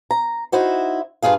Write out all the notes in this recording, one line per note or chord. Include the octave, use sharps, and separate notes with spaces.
A#5
D#4 E4 F#4 C5
G2 C#3 F4 G#4 F5